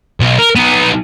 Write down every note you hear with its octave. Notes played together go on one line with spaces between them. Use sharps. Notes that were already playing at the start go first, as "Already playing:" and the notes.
B1
A#4
B3 D#4